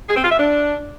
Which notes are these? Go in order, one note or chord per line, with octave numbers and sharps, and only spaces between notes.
G#4
C4
F4
E5
D4